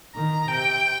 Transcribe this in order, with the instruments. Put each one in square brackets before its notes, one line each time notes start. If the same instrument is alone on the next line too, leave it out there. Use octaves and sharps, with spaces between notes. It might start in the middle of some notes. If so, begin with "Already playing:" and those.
[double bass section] D#3 [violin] A#5
[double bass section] C3 [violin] G5